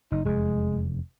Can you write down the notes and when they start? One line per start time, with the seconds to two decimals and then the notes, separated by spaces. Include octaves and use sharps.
0.12 F#1 D#4
0.25 F1 E2 G#3